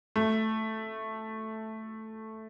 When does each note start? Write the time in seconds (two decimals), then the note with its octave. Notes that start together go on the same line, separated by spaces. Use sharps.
0.16 A3